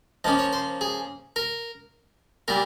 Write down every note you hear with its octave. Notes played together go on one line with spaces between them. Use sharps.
F3 A#3 C#4 D#5
C#5
C5
G#4
A#4
A#2 G3 A#4